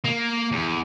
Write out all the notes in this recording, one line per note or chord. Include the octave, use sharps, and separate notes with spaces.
A#3
E2